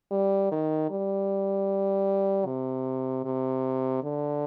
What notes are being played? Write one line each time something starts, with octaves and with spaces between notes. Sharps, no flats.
G3
D#3
G3
C3
C3
D3